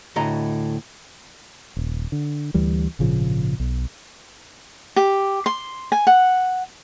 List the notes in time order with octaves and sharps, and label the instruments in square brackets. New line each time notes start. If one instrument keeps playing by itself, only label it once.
[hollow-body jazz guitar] D2 A2 D#5 A#5
[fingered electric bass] D#1
D3
D2 E3 G3
G#1 A#2 C#3 F3
B1
[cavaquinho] G4
C6
G#5
F#5